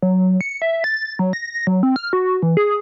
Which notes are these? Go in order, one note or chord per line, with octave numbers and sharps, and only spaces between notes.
F#3
C#7
E5
A6
F#3
A#6
F#3
C4
F6
F#4
E3
G#4